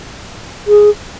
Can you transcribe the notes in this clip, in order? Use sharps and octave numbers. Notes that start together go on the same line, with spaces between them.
G#4